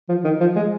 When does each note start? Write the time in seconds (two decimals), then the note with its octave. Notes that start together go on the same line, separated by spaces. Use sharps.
0.09 F3
0.24 D#3
0.40 F3
0.56 G#3